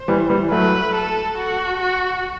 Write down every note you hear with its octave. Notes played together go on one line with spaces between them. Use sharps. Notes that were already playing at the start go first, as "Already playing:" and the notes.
Already playing: C5
E3 G3
E3 G3
F#3 A3 B4
A4
F#4
F#4